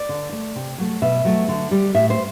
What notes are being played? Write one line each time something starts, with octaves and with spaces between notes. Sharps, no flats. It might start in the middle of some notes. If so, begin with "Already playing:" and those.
Already playing: D5
D3
A3
C3
F#3 A3
B2 E5
F#3 A3
D3
G3
A2 E5
C5